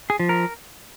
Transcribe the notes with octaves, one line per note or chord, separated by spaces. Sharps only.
G#4
F3
A#4